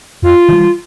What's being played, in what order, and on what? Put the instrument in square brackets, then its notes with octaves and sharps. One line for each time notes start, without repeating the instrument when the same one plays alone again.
[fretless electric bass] F2 [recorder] F4
[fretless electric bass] E3 G3